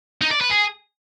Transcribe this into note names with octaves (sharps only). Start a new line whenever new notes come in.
D#4
D5
B4
G#4